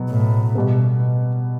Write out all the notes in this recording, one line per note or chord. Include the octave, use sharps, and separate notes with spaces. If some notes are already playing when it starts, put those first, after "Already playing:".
Already playing: B2 F#3 B3
A2
B2 G3 B3